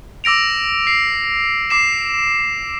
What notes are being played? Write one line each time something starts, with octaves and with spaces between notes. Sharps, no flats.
D6 E6 A#6 D7 F7
C7
D6 C7 E7